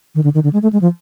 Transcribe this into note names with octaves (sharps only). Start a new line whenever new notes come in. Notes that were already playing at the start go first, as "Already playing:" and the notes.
D#3
D3
D#3
D3
G#3
A3
G#3
F3